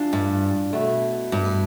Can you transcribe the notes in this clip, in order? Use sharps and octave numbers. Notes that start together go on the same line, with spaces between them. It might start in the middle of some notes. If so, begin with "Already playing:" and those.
Already playing: E3 G3 D4 F4
G2
B2 A3 E4
G2